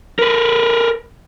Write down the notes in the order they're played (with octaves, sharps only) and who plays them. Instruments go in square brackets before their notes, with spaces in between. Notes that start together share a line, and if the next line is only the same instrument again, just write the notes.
[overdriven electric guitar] A#4 B4